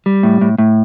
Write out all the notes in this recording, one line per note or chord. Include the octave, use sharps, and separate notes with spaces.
G3
A2
A2
A2